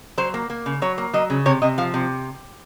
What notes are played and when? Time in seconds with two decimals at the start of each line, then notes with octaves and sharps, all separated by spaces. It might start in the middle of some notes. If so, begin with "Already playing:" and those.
0.18 F#3 C5
0.34 A#3
0.50 A#3
0.66 C#3
0.82 F#3 C#5
0.98 A#3
1.13 F#3 D#5
1.30 C#3
1.46 C3 C#5
1.62 C3 D#5
1.78 F3 F5
1.94 C3